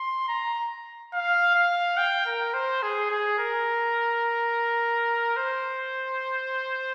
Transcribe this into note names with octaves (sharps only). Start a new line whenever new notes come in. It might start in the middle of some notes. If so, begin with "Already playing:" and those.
Already playing: C6
A#5
F5
F5
G5
A#4
C5
G#4
G#4
A#4
C5